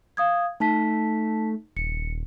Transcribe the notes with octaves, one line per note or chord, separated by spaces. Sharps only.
F5 D#6 G#6
A3 D#4 A5 B6
D#1 C#7